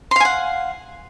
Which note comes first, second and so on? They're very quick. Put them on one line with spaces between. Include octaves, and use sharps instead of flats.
C6 F5 G#5 F#5